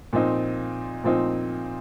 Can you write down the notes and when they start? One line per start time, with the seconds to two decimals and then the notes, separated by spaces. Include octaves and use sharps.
0.13 A#2 F3 C4 D#4
1.04 A#2 F3 C4 D#4